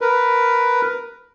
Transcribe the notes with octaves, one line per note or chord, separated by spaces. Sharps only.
A#4 B4